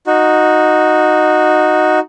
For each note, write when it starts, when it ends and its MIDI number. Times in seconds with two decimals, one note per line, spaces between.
0.07 1.99 63
0.07 1.99 66